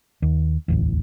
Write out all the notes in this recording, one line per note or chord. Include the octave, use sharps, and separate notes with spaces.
D#2
D1 A1 E2